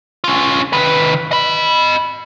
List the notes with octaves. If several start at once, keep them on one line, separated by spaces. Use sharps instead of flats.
C#4 F4
D#3 B4
D#5 B5